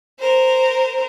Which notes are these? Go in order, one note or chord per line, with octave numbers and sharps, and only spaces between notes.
A#4 C5